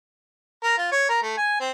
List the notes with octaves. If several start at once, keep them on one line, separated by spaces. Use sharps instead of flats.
A#4
F4
C#5
A#4
A3
G#5
C4